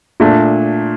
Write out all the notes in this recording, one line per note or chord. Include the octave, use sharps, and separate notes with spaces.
A#2 A3 D4